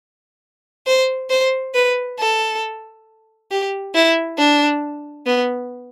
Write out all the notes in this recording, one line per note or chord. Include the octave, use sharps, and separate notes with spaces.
C5
C5
B4
A4
G4
E4
D4
B3